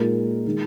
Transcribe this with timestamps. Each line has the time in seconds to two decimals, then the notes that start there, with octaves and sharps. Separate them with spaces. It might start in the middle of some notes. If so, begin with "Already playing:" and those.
Already playing: A#2 G#3 D#4 A#4
0.47 D#3 G#3